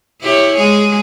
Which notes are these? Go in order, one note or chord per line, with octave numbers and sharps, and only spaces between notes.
E4 G4 C#5
G#3 G#4